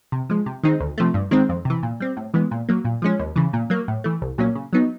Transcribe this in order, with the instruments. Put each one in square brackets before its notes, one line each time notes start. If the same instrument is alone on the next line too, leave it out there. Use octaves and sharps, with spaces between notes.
[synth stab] C3
F3 G#3
C3
D#3 G#3 C4 D#4
D2
C3 F3 A3
G2
D#3 G#3 C4
F2
C3 E3
A#2
G3 C4
A2
E3 G#3 B3
A#2
F#3 A#3
A#2
F3 G#3 C#4
D#2
C#3 E3
A#2
F#3 A#3
A2
E3 A3
C2
A#2 F#3 A#3 C#4
C#3
F#3 B3 D#4